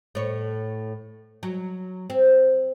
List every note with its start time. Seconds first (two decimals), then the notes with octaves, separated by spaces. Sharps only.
0.15 A2 C#5
1.43 F#3
2.10 C4